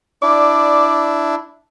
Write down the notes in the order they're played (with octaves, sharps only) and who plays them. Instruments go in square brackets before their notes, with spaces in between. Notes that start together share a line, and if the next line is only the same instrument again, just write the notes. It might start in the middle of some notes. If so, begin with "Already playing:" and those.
[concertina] D4 E4 [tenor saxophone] D5